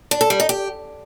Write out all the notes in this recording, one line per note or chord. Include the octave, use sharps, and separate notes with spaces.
D4
A4
G3
D#4
G4